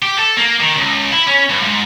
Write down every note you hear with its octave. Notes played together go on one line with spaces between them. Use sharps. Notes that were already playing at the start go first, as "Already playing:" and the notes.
G4
A4
A#3
D#3
C#2
E4
C#4
G2
G#2